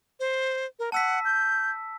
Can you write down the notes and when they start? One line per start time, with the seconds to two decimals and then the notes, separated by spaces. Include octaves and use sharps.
0.20 C5
0.79 A#4
0.92 F#5 A5 E6 B6
1.25 G6